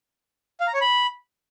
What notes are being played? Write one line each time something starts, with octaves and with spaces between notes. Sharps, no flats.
F5
A#5
C#5
B5